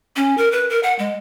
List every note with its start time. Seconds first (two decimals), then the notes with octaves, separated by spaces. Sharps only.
0.16 C#4
0.38 A#4
0.52 B4
0.70 A#4
0.83 F#5
0.99 G#3